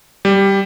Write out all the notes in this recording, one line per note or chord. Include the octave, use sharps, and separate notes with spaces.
G3